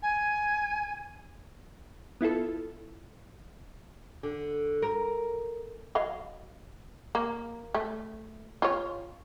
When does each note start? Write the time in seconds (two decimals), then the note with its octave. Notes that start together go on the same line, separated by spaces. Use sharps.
0.02 G#5
2.21 B3 E4 F4 A4
4.23 D3
4.82 A#4
5.95 F#3 D#5 F5
7.15 A#3
7.74 A3
8.62 F4 C#5